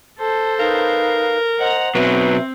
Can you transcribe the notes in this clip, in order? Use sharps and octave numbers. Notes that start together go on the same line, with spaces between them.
A4 C5 A5
D#4 A#4 B4 F5
C5 D#5 F#5 A#5
B2 F#3 C4 B4 E5